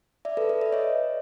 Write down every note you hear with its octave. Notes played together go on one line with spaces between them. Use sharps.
D5 E5
A4 B4
A4 B4
D5 E5
C#5 D#5